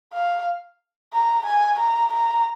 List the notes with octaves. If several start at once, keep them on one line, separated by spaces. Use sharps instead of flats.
F5
A#5
G#5
A#5
A#5